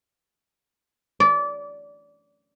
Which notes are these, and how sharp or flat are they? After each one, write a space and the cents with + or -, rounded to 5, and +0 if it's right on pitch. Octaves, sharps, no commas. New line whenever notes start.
D5 -25